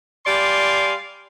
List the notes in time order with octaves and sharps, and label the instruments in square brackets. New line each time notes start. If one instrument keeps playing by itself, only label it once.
[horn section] G3 D5 F5 G#5 C6